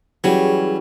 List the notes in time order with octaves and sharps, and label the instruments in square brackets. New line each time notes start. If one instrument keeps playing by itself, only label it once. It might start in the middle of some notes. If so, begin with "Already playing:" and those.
[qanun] E3 G3 C#4 [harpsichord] F#3 [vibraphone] G#4